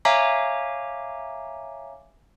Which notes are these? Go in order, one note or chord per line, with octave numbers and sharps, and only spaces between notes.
C#5 E5 F5 G#5 A#5 D6